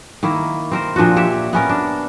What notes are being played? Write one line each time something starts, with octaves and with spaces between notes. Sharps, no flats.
D#3 A#3 E4
C4 A#4 C5
A#2 F3 D4 F#4
G4 C#5 E5
B3 C#4 A#4
D4